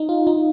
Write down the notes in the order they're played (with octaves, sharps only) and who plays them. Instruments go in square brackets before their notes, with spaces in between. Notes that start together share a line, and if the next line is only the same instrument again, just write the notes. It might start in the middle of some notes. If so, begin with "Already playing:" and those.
Already playing: [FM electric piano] D#4
F4
D#4